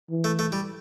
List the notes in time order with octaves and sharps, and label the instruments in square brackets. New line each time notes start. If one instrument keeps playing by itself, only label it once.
[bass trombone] E3
[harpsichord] A3
A3
G3